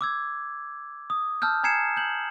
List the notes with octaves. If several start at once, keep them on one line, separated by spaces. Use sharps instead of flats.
D6 E6 G#6
D#6
A5 E6 F6 G6
G#5 A#5 G#6 C7 C#7 E7
G6 F#7